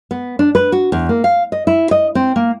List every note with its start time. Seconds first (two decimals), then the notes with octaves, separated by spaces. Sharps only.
0.11 B3
0.39 D4
0.55 B4
0.72 F#4
0.92 E2
1.09 A#3
1.24 F5
1.52 D#5
1.67 E4
1.91 D#5
2.15 C4
2.36 A#3